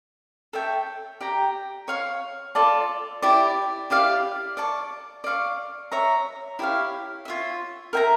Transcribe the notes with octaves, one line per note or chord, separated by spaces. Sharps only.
A4 C#5 E5 G5
G4 D5 G5 A#5
C#5 F5 C#6
F4 A4 D5 A5
E4 G4 D5
E4 G4 D5 F5
D5 A5 C#6
D5 F5 C#6
C#5 E5 A#5
E4 G4 C#5 F5
F4 C#5 E5
A#4 E5 G5 A#5